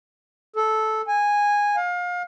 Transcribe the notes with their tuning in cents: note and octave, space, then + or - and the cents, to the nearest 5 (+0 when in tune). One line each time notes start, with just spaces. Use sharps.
A4 -10
G#5 -10
F5 +30